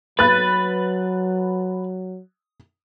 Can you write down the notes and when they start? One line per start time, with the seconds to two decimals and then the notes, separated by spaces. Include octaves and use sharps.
0.19 F#3 B4 F#6 A6